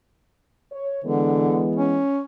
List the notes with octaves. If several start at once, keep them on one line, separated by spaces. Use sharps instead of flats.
C#5
D3 E3 G#3 B3
C#4